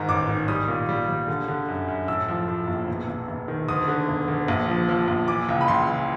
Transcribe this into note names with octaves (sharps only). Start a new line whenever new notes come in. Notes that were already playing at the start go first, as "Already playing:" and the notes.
Already playing: G#2 D#3 A#5
A1 D6
D#3
G3 D#6
A#2
G3
G3
D3
D3
F#2
F#2
A2 E6
F3
A2
A#1
E1
E1
E1
D#3
D2 D#6
D3
E1
D2
A#1
F3
F3
A#1
E3 D6
C#2
B5
C#2 C6
E3